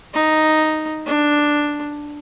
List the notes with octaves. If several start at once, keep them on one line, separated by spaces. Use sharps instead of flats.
D#4
D4